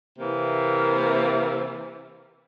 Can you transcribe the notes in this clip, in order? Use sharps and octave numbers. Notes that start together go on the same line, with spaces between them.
C3 E3 A#3